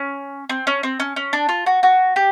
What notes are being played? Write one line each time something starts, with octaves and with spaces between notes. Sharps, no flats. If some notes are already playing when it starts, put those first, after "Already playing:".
Already playing: C#4
C4
C#4
C4
C#4
C#4
D4
F4
F#4
F#4
G4